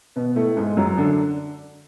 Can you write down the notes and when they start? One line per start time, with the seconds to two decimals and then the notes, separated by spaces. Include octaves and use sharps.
0.16 B2 B3
0.36 A2 A3
0.57 G#2 G#3
0.77 F#2 F#3
0.97 D3 D4